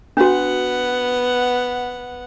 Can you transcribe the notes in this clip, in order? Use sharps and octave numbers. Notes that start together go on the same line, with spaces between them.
B3 D4 F#4 F#5